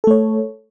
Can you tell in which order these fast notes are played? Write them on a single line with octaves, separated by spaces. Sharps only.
A4 A3 C#5